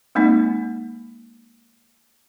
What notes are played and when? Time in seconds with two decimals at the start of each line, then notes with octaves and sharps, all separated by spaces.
0.15 G#3 A#3 C4 D#4